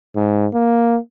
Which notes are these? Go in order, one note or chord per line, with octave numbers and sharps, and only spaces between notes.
G#2
A#3